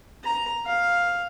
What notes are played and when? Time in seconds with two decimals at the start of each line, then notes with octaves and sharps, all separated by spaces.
0.24 A#5
0.65 F5